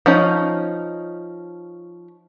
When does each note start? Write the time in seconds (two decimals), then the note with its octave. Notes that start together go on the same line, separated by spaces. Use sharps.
0.06 F3 C#4 D#4